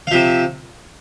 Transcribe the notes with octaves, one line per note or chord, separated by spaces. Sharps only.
F5
C3 F3 E5